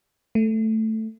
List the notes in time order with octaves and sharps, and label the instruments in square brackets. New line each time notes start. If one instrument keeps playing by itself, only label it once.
[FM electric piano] A3